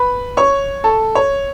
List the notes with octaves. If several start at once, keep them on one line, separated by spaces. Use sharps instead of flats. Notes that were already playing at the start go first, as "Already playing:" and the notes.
Already playing: B4 B5
C#5 C#6
A4 A5
C#5